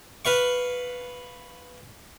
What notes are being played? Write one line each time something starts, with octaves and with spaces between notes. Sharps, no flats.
B4 F5 C#6